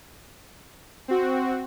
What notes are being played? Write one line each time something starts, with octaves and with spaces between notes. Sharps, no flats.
C4 F#4